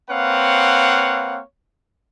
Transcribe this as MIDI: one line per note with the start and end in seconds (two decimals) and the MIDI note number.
0.10 1.40 58
0.10 1.40 60
0.10 1.40 71
0.10 1.40 73
0.10 1.40 77
0.10 1.40 78